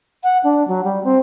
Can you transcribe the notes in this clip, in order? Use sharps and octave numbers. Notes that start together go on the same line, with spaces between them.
F#5
D4
F#3
G3
C4